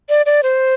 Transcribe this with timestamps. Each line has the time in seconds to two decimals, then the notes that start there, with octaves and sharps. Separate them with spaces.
0.09 D5
0.26 D5
0.43 C5